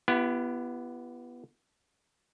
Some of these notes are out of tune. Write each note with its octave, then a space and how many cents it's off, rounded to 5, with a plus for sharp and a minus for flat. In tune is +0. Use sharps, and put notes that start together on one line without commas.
B3 -5 E4 +35 G4 +0